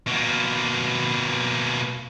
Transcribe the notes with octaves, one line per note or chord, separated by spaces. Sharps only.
B2 A#3